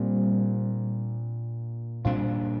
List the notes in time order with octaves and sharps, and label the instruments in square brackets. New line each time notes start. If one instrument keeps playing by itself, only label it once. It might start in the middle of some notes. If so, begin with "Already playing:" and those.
Already playing: [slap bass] A#2 A#3 D4 [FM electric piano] G3 C4
[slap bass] A#2 G3 D4 [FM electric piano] C4 F4